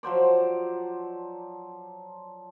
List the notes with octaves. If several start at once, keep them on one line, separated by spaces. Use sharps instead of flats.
F3 F#3 C5 D5